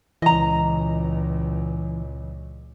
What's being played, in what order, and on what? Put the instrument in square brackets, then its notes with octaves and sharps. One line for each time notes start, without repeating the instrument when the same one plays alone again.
[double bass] C#2 A#2 [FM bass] E3 [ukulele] D#5 A#5